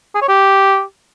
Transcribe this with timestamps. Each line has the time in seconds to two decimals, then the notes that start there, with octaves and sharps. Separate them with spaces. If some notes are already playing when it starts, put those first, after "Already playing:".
0.15 G#4
0.22 C#5
0.28 G4